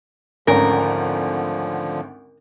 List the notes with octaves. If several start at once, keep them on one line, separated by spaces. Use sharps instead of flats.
G#1 D2 D3 F3 C#4 A#4